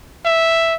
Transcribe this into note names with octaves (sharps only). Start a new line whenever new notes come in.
E5